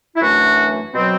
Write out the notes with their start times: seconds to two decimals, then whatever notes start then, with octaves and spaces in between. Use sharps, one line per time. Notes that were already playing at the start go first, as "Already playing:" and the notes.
0.16 E4
0.20 F#2 E3 A3 D4 F#4
0.94 B2 F#3 C4